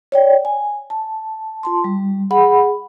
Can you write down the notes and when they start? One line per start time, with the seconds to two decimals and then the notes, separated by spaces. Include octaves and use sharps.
0.12 C#5 D5 G5
0.45 G#5
0.90 A5
1.63 F4 A5 C6
1.84 G3
2.31 G#4 F#5 B5